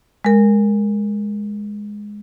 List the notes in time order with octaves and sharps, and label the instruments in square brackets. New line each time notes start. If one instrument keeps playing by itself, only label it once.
[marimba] G#3 A#4